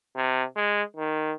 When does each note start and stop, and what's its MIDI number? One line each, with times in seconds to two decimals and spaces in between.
0.16 0.44 48
0.57 0.83 56
0.96 1.33 51